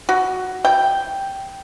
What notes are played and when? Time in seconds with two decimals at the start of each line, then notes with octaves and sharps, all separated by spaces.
0.09 F#4
0.65 G5